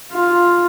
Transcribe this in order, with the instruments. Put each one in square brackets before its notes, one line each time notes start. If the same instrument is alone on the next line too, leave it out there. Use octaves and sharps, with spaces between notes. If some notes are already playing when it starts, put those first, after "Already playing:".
[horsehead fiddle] F4